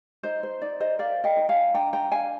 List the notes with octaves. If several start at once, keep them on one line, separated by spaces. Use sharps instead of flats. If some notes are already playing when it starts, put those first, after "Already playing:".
D#4 C5 D#5
C5
D#4 D5
C5 D#5
A#4 D5 F5
D#5 G5
D#4
F5 G#5
D4 G5 A#5
G5 A#5
D4 F5 G#5